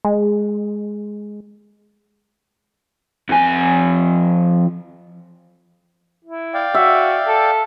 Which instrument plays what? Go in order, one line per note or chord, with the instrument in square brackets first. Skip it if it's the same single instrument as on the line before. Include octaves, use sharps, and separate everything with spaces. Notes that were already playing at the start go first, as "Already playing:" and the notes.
[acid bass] G#3
[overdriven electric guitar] F2 G#5
[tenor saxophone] E4
[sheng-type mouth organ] D5 F5 G5
[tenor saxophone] F#4 [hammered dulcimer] E5
[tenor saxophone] A4